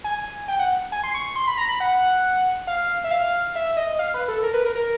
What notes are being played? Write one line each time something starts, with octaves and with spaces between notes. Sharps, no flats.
G#5
G5
F#5
G#5
C6
C#6
C6
B5
A#5
B5
F#5
F5
E5
F5
E5
D#5
F5
B4
A4
A#4
B4
A#4
A#4